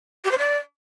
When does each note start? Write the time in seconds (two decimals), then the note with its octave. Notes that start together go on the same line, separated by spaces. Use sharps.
0.24 G4
0.31 C5
0.38 D5